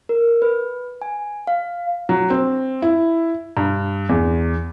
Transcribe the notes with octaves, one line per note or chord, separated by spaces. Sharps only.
A#4
B4
G#5
F5
F#3
C4
E4
G2
E2